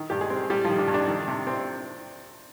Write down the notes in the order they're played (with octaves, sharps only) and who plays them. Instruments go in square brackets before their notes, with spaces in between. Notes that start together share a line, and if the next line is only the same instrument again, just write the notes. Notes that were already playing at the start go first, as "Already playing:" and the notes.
Already playing: [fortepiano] D#3
G2 G4
G#3 G#4
C4
G3 G4
F3 F4
D#3
D4
G2
D4
D#3
C3
C4